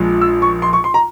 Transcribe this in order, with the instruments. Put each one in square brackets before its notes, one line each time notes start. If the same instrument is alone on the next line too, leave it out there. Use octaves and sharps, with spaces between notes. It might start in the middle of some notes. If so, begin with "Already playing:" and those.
Already playing: [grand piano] A#1 A#2 F3 G#3
E6
C#6
C6
C#6
C6
A#5